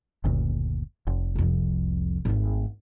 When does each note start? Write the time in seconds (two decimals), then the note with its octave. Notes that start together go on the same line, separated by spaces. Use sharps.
0.24 F#1 D2 A#2
1.07 F1
1.35 C2 F2
2.25 G#1 A3